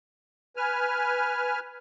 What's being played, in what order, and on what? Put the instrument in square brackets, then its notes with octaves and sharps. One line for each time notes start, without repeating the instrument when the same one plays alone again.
[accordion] B4 G#5 F6